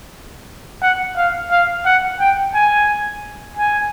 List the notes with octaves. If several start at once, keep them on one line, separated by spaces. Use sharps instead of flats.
F#5
F5
F5
F#5
G5
G#5
G#5